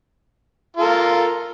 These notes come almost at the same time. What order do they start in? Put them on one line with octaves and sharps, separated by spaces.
F4 A4 A#4